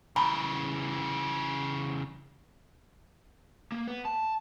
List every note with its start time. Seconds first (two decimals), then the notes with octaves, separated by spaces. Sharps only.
0.16 C#3 E3 G#5 A#5 B5
3.72 A#3
3.88 B3
4.05 A5